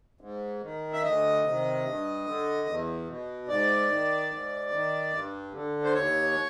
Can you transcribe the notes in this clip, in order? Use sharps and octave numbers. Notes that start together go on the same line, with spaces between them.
G#2
D#3
E5
D2 D#5
C3 D#3
G2
D3
E2
B2
G#2 D5
D#3
G#2
D#3
G2
D3
C5
D#2 C#5